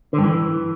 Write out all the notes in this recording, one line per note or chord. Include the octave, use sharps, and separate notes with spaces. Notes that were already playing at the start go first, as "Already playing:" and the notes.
D3
G2
E3